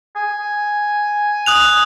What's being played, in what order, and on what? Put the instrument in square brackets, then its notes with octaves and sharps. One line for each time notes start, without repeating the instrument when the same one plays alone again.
[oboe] G#5
[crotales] D#6 F#6 F7